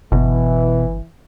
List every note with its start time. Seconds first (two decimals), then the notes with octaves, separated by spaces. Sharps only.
0.12 G1 B2 E3